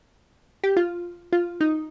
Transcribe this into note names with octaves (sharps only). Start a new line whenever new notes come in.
G4
F4
F4
D#4